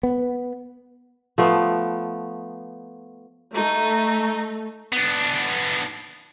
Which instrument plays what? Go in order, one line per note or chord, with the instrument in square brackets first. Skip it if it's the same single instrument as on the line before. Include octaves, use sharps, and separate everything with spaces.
[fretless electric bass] B3
[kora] F3 A3 B3
[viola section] A3 [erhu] D#4
[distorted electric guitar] B3 D4